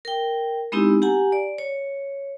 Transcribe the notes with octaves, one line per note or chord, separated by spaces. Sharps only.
A#4 G5
G#3 B3 C4 D#4 E4 G4
G4 F#5 G#5 A#5
D5
C#5